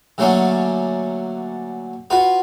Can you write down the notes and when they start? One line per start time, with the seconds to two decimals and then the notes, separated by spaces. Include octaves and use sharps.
0.18 D3 F#3 A3 A#3 C#4 D4
2.10 F4 F#4 B4